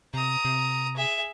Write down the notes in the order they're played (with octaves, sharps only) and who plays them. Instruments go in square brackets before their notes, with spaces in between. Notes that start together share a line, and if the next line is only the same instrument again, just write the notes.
[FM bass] C3 [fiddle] A#5 D#6
[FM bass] C3
[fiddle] G#4 E5